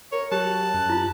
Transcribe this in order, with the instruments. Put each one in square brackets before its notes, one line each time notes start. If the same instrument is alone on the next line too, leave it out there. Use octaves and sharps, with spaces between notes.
[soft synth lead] A#4 [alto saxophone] C#5
[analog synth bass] F#3 [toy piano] G4 [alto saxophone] A5 [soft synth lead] F#6
[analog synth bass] F#2
[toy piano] E4 F4